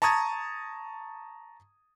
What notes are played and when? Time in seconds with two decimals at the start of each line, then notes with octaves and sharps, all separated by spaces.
0.02 A5 A#5 C#6 D#6 G#6 A6